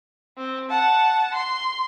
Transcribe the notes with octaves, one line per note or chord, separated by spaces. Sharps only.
C4
F#5 A5
C6